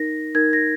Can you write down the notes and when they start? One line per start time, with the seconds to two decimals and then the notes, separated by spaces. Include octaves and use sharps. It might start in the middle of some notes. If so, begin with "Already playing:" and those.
Already playing: D#4 A#4 A#6
0.35 D#4 A#4 G#6
0.53 A#6